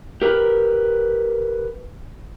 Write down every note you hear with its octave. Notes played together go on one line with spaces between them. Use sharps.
G4 A#4 B4